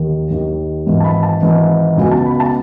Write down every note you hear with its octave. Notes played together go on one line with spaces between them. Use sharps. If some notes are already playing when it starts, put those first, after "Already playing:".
Already playing: D#2 D#3
D#2 D#3
G#1 G#2 E3
A5
B5
A5
G#1 G#2 E3
C#2 B2 G#5
A5
B5
A5